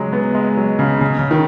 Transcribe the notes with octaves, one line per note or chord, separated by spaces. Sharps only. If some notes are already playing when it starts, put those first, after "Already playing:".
Already playing: C#3 F#3 G#3
B3
G#3
F#3
C#3
C#3
C#3
D#3